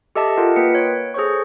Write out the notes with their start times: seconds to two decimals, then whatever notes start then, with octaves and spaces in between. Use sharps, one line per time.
0.15 G4 A4 D#5 E5 A5
0.37 F4 A#4 D#5 F#5
0.56 A#3 B4 G5 B6 C#7
0.75 C#5
1.14 G#4 A4 C5 C#5 C#6